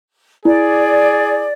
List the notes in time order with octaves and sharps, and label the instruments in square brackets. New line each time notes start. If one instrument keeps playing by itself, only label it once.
[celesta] E4 [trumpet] G#4 [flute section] D5